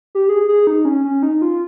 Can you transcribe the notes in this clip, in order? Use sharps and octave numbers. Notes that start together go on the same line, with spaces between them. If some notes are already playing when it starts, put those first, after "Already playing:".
G4
G#4
G#4
D#4
C#4
C#4
D#4
F4